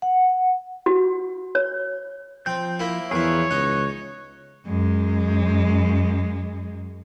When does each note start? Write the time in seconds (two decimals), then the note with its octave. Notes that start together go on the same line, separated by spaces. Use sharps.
0.02 F#5
0.86 F#4
1.55 C#5
2.46 F3 C4 G6
2.79 A#3 E4
3.11 E2 F3 E4 G#4 A#4 B4 C#5
3.51 C#2 D#4 F#6
4.66 F#2 G#3